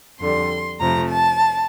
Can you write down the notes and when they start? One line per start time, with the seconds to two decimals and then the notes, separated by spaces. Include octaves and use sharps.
0.20 F2 D3 G3 C6
0.80 F2 C3 F3 A3 A#5
1.09 A5